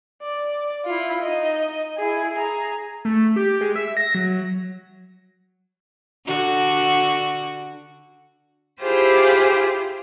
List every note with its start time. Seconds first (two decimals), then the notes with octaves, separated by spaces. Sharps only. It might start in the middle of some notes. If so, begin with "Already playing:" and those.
0.22 D5
0.85 E4 F4
1.23 D#4 D#5
1.98 E4 G#4
2.36 G#4 A#5
3.05 A3
3.36 G4
3.61 G#3
3.76 E5
3.97 A#6
4.15 F#3
6.26 D3 F#4
8.81 E4 F4 G4 G#4 C5